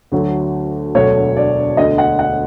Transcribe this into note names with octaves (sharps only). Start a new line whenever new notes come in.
D2 D3 F#3 A3
E1 D2 D3 F#3 A3 C#5
D5
E1 D2 D3 D#5
F#5
F#5